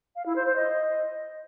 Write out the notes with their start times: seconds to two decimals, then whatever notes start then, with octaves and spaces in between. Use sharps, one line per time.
0.15 F5
0.25 E4
0.35 C5
0.45 C5
0.55 D#5